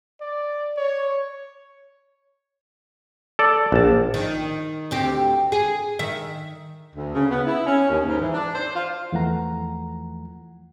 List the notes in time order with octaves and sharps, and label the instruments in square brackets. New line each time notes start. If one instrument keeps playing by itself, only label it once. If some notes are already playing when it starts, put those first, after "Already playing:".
[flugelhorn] D5
C#5
[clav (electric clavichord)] A4 D5
A#1 A5
[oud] D#3
D2 C4 G4
G#4
D#3 E5
[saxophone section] D2
C#3
B3
E4
C#4
D#2
G#2
E3
D4
C5
F4
[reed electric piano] E2 E3 F3 A3 F#5 A#5